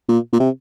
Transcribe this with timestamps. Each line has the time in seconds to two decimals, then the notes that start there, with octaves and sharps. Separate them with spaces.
0.09 A#2
0.33 A#2
0.40 C3